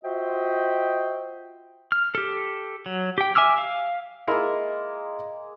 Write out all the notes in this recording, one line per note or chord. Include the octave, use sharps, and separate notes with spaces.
F4 F#4 C5 D#5 E5 G5
F6
G4 A4
F#3
G4 G5
E5 G#5 D6 E6 F6
F5
G#3 A#3 E4 F4 A#4